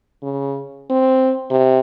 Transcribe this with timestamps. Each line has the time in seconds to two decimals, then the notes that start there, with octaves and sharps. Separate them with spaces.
0.23 C#3
0.90 C4
1.51 C3